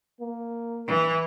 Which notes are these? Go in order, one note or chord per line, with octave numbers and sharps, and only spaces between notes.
A#3
E3